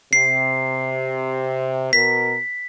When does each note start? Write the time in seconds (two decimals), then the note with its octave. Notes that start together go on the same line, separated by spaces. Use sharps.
0.13 C3 C7
1.93 B2 A#4 B6